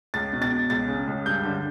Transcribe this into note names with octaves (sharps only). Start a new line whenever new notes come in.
C#2 A6
B2
A6
B2
C#2 A6
C#3
C#2
G2 G6
D3